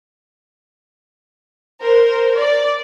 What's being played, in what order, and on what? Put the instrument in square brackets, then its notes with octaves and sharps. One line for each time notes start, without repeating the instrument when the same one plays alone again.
[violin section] A#4 C5
D5